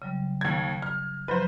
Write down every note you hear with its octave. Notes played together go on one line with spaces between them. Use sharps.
C#3 F#3 G3
D#2 G#6
F6
F#2 F3 F#3 B4 C5